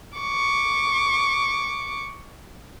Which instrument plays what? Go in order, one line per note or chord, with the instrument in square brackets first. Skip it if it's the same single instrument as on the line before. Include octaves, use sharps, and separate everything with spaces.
[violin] C#6 D6